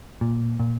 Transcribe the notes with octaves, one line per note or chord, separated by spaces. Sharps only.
A#2
A#2